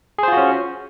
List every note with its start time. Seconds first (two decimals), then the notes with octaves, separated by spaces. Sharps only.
0.18 G#4
0.23 C5
0.28 F4
0.33 F#4
0.37 C#4